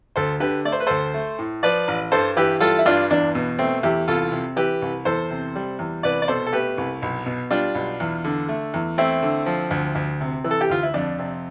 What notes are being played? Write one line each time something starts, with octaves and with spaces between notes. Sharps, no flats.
D2 A4 C5
D3 G4 B4
A3 D5
C5
B4
D2 A4 C5
A3
A2
F3 B4 D5
A1
G2 A4 C5
E3 G4 B4
G3 F4 A4
E4
G2 D4 F4
E2 D4
B2
A3 C4
E2 E4 G4
C2 F4 A4
C3
E3 G4 B4
C2
E2 A4 C5
C3
G3
E2
C2 B4 D5
D5
B2 A4 C5
A4
A3 G4 B4
C2
B1
B2
G3 D4 F4
B1
E2
D3
A3
E2
A3 C4 E4
D3
F3
D2
D2
C3
E3
A4
G4
D2 F4
E4
F2 D4
C3